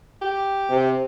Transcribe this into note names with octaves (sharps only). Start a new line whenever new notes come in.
G4
C3